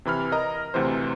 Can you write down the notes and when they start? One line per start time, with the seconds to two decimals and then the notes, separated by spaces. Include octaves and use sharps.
0.05 C3 E3 B5 F6
0.32 A#4 D#5 A#5
0.74 D2 C3 E3 C5